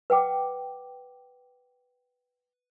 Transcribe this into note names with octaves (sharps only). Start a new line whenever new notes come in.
B4 F#5 G5 D6